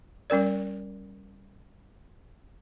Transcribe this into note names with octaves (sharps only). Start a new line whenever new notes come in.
G3 C#4 A#4 D5